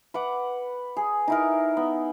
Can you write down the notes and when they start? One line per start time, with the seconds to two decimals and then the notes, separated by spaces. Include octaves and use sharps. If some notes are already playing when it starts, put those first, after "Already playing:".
0.14 B4 F#5 D6
0.97 G#4
1.28 D#4 E4 A#4
1.77 B3